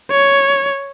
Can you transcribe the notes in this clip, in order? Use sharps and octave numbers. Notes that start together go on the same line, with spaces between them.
C#5